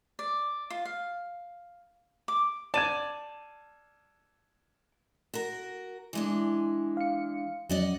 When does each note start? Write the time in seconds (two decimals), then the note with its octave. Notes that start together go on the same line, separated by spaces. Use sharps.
0.19 D5
0.70 F4
0.85 F5
2.28 D6
2.74 D5 A5 G#6 D#7 E7
5.34 F#4 A#4
6.13 E3 G#3 D4
6.97 F5 C#7
7.69 F2 F#3 C#4 D5 D#5 F#5